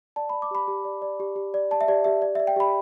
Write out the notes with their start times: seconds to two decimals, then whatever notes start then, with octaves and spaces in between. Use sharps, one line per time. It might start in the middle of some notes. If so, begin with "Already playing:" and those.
0.16 D5 A5
0.29 B5
0.33 D5
0.42 D6
0.51 G4 B5
0.68 G4
0.85 D5
1.02 D5
1.20 G4
1.36 G4
1.54 D5
1.71 D5 A5
1.81 E5
1.88 G4 D5
2.04 G4 E5
2.22 D5
2.35 E5
2.40 D5
2.47 G5
2.56 G4 B5